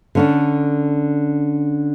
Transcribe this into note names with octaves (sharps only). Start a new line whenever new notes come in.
D3 C#4 D4